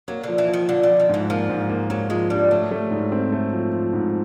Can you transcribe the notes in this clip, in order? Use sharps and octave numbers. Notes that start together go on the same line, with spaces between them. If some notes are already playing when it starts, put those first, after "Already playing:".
F#3 A#3
D3 F3
E3
F3
D#3
D3 F3
D3
F3
D#3
G#2 E3
F3 A#3
G#2
A#3
F#3 A#3
F3 G#3
G3 D4
F#3 A3
A3
G#2
C4
A3
F3
F3
G#2